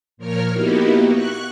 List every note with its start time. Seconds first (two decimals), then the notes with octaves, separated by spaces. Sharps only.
0.17 A#2 F3 A#4 C#5 F6
0.51 A#3 B3 D#4 E4 F#4 G4
1.12 C#6 F#6